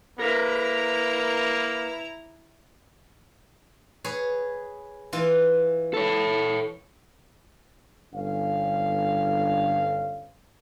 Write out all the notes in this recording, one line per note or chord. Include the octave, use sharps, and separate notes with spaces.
A#3 E4 A#4 B4 A#5
G#4 B4 C#5
E3 F4
A4 C#5
G1 C#4 F5